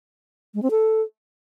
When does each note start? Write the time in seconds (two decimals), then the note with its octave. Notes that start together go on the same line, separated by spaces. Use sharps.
0.54 G#3
0.63 C4
0.71 A4